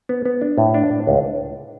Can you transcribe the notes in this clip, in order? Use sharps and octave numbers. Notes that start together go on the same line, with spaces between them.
B3
B3
D4
A2
D4
A2
C#2